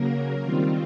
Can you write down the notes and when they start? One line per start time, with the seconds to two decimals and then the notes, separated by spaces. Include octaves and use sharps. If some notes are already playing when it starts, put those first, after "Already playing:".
Already playing: C#3 F#3 A#3 A#4
0.43 D#3 G3 C4 F4